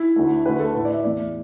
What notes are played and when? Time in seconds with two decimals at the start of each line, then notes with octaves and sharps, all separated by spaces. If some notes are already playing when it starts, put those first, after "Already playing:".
Already playing: E4
0.16 D2 D3 A3
0.45 D2 D3 A3 B4
0.60 A4
0.75 A2 A3 B4
0.85 D5
0.94 E5
1.04 E2 E3 A3 D5